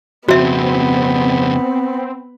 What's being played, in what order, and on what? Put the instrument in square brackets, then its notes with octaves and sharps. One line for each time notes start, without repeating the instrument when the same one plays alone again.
[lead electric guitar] F2 C#3 [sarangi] B3 [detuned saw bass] C4 [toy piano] F#4 E5